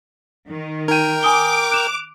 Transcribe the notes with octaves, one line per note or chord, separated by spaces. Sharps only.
D#3
D#4 A#4 G5 D#7
G#5 D6 D#6 G7
F#6 E7 F7